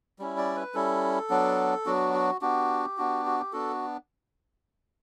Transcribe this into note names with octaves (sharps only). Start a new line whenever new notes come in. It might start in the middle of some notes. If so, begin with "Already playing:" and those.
G3 C#4 E4
D5
B4
G3 C#4 E4 A4
F#3 B3 D4
F#3 B3 D4 F#4
F#4
B3 D4 F#4 G4
B3 D4 F#4
F#4
G4
B3 D4 F#4 A4